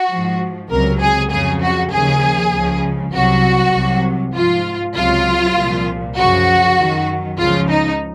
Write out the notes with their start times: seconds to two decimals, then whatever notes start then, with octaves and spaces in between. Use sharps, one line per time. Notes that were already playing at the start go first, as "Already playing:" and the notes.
Already playing: F#4
0.09 G#2 F3
0.69 C#2 C3 F#3 A#4
1.00 G#4
1.30 F2 C#3 F#3 G#4
1.61 F#4
1.91 D#2 C#3 F3 G#4
2.52 C#2 C#3 F3
3.13 C2 C3 F#3 F#4
3.73 C2 C3 F#3
4.34 G#2 F3 F4
4.95 C#2 C3 F#3 F4
5.56 C2 A#2 F3
6.17 F#2 C#3 F3 F#4
6.78 F#2 D#3 F#3
7.38 C#2 C#3 F3 F4
7.69 D#4